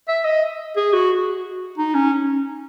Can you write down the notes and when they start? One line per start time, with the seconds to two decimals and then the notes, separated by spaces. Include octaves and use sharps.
0.08 E5
0.25 D#5
0.76 G#4
0.93 F#4
1.78 D#4
1.94 C#4